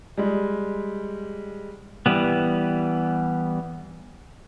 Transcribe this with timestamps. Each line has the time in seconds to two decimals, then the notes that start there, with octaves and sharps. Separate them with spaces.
0.18 G3 G#3
2.06 E3 G3 B3